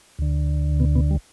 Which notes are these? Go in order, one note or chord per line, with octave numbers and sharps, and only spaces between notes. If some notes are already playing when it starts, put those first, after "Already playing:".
D2 D3
B2 B3
B2 B3
G3